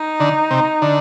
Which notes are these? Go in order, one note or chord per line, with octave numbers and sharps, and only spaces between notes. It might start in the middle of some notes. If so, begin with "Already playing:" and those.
Already playing: D#4
D3
C3
D3